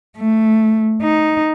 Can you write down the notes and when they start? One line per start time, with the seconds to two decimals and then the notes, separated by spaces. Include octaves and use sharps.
0.18 A3
1.03 D#4